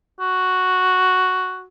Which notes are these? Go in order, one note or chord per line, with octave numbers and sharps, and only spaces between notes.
F#4